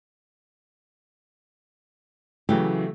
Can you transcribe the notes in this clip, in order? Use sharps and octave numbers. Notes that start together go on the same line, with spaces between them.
C#3 E3 F#3 A3 F#4 G4